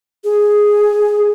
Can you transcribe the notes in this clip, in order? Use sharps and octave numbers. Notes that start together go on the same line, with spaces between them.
G#4